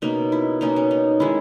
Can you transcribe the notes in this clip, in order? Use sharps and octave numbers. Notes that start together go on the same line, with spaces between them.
B2 A#3 C#4 D#4
E4
B2 A#3 C#4 D#4
C#4
D#4
D#3 G#3 C#4 E4